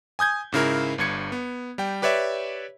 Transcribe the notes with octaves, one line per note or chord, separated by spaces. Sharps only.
G#5 D#6 G6 G#6
G#2 C#3 E4 A#4
G1 G2 G#6 C#7
B3
G3 G5
G4 B4 C#5 D5 E5